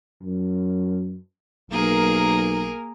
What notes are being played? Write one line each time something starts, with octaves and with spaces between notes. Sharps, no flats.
F#2
B1 A#3 G#4 A#4